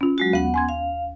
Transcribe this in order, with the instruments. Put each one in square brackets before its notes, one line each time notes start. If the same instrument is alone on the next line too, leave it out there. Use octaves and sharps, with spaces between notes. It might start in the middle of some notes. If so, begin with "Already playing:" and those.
[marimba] C#4 F4
[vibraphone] F#3 G#3 F#4
[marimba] D#2 [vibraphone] B3 F#5
[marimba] G#5 C6 G#6
[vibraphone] F5